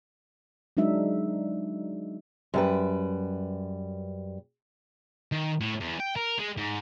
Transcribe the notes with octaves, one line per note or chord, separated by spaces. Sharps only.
F#3 G#3 D4 D#4 E5
F#2 G3 B4
D#3
A2
E2
G5
A#4
G#3
G#2